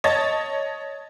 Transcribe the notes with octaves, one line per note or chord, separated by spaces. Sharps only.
C#5 D#5 A5 G#6 A6